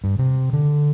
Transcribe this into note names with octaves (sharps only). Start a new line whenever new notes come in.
G2
C3
D3